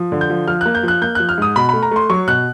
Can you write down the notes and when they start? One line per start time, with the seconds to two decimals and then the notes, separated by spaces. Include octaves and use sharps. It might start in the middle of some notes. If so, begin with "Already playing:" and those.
Already playing: F3
0.12 D3
0.21 G6
0.30 F3
0.47 F3 F6
0.61 A#3 F#6
0.75 G6
0.83 F3 F#6
1.02 A#3 G6
1.15 F3 F#6
1.29 F6
1.38 G#2 D#6
1.56 B2 B5
1.69 A3 B5
1.83 A#5
1.91 A3 C6
2.10 F#3 C#6
2.27 B2 F#6